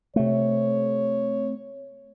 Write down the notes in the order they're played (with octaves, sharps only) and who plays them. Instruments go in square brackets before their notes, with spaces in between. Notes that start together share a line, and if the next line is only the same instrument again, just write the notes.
[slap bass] C3 A3 [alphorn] C#5